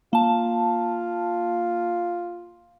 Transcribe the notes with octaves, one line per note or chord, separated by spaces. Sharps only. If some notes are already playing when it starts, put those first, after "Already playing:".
A#3 F4 A5